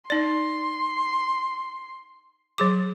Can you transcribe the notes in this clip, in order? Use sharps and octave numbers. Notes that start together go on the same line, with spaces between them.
D#4 D5 C6
F#3 G#4 D6